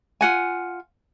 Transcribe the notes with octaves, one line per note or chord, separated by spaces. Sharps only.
F4 F#5 G#5